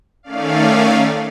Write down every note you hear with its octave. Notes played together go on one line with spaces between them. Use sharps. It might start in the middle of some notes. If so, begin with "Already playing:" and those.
D#3 A3 C#4 D5 F5